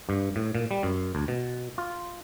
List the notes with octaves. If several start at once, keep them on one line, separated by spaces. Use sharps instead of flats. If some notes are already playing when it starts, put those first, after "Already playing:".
G2
A2
A#2
G3
F#2
D2
B2
F4